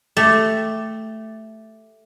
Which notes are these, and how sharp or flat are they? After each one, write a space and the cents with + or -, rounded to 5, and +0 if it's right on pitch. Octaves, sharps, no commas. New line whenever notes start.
A3 +0 G4 +0